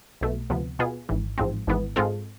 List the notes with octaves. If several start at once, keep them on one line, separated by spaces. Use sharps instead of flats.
B1 B2 A3
D2 C3 F3 B3
B2 B3 F4 G#4
G#1 G#2 E3
A1 G#2 F3 G#3 C4
G#1 G#2 E3 B3
G#2 G#3 C4 F4 A4